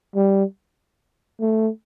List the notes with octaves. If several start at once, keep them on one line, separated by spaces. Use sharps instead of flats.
G3
A3